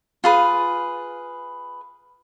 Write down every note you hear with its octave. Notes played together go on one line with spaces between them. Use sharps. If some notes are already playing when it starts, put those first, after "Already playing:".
F4 G#4 B4